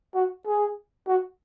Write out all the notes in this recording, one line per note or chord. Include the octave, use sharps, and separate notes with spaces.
F#4
G#4
F#4